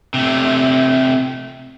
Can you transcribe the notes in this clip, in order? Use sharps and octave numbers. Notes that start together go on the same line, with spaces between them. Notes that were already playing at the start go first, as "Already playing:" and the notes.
C3 A3